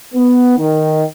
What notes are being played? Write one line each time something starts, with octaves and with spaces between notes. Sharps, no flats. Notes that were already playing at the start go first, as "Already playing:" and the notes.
B3
D#3